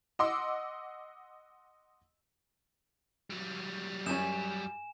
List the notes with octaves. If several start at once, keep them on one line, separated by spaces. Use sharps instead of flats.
D#5 F#5 C6 D6 E6
F#3 G3
F#2 C#4 G#5 E7